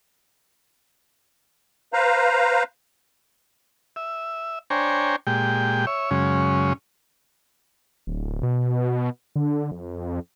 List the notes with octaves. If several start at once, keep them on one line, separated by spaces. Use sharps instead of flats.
B4 C5 F5 A#5
E5
D4 C5 C#5 G5 G#5 A#5
A#2 G#3 G4 G5
C#5 E5
F#2 C#3 G#3 C#4
D1
B2
D3
F2